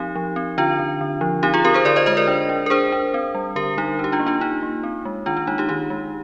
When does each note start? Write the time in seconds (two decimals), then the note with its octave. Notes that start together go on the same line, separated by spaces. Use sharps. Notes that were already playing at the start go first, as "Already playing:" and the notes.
Already playing: F3 C4 D#4 G4
0.16 F3
0.36 C4
0.58 D3 D4 F4
0.80 D3
1.01 D3
1.21 F3
1.43 C4 D#4 G4
1.54 F4 G#4
1.64 C4 G4 A#4
1.74 G#4 C5
1.85 D3 A#4 D5
1.96 C5 D#5
2.06 G#3 C5 D#5
2.17 A#4 D5
2.28 D4
2.49 D4
2.66 A#4
2.70 D4 G#4 C5
2.92 D4
3.14 C4
3.35 G3
3.55 D3 G4 A#4
3.77 G3 D#4 G4
3.99 D4
4.04 G4
4.12 D4 F4
4.19 A#3
4.27 D4 F4
4.41 D4 D#4
4.63 A#3
4.83 C4
5.05 G#3
5.26 D#3 D4 F4
5.37 D4
5.47 G#3 D#4
5.58 D#4 G4
5.69 D#3 D#4 G4
5.90 G#3